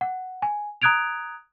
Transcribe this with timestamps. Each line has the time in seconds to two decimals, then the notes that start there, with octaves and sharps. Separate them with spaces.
0.01 F#5
0.42 G#5
0.82 A#5 D#6 F#6 G#6 D7 F7